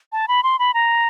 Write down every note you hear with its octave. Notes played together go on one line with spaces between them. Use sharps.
A5
B5
C6
B5
A#5